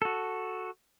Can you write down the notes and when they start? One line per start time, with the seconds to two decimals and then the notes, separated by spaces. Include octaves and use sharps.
0.02 F#4 A4